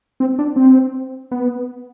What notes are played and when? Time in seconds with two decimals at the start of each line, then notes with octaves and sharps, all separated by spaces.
0.20 C4
0.39 D4
0.56 C4
1.31 B3